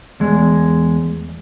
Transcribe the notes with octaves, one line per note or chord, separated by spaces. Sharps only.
E2 G#3